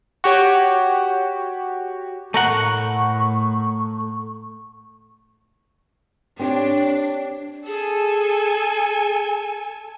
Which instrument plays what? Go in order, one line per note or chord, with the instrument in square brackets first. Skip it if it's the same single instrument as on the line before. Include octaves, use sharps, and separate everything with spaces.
[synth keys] F#4 G4 C#5
[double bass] A2 [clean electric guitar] A3 A#4 F#5 [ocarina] C#6
[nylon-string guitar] C4 G4 C#5 [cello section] D4
[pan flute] G#4 [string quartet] A4 G#5